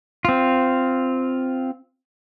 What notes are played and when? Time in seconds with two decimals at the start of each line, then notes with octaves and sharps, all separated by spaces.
0.25 C4 F4